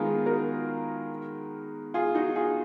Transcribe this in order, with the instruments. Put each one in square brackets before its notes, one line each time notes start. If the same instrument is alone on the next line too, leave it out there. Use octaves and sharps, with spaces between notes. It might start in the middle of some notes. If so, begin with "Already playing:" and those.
Already playing: [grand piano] D#3 G#3 B3 [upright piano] F4 G#4 A#4
[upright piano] F#4 A#4
F4 G#4
D#4 F#4
F4 G#4